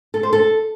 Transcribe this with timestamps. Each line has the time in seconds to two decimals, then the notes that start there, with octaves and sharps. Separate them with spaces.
0.14 A4
0.23 C5
0.33 A4